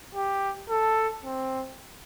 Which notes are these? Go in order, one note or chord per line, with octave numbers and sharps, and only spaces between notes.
G4
A4
C4